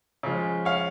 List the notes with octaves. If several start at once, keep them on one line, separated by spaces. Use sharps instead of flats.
C#3 F3 G#3
C#5 F5